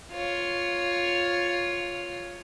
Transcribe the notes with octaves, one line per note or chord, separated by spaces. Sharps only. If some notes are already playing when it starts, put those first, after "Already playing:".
F4 C#5